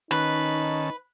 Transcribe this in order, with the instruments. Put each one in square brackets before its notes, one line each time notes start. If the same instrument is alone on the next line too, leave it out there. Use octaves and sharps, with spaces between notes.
[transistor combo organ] D#3 C#4 A5 [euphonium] D#4 [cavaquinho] B4